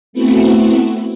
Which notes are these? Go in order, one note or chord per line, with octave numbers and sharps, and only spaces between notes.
A3 B3 C4 E4 F#4